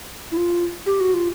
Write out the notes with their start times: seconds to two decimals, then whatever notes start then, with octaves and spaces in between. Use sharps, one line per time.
0.31 E4
0.37 F4
0.86 G4
1.00 F#4
1.14 F4